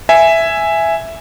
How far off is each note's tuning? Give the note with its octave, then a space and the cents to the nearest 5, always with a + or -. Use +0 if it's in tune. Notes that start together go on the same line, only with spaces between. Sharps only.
E5 +5 G#5 +0